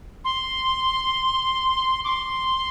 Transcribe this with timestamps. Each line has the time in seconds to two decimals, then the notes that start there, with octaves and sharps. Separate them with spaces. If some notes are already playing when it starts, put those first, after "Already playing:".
0.24 C6
2.04 D6
2.08 C6